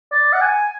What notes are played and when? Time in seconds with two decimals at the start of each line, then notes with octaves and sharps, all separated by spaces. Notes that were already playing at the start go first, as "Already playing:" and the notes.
0.12 D5
0.33 F#5
0.41 G#5